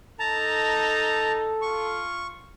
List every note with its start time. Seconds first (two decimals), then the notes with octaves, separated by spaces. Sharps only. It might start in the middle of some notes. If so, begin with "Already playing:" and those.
0.19 D#4 A4 A5 A#5
1.62 F4 C#6